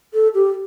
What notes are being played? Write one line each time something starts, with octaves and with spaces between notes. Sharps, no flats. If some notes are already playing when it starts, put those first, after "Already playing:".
A4
G4